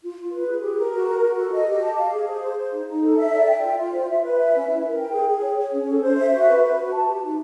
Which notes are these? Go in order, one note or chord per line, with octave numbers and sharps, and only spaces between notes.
F4
F4
B4
G#4
G4
A#4
F#4
A#4
F#4
A4
D#5
G4
A5
F5
G#4
C5
C5
C5
D#4
D#4
A4
E5
D5
G5
F4
F4
C5
E5
B4
E5
C#4
E4
A#4
G5
G#4
G#4
C#5
C#5
C#4
A4
C5
E5
F#4
B4
B4
F#4
A5
G4
D#4